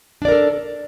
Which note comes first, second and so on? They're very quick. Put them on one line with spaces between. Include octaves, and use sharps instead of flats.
D4 D5 A#4 A4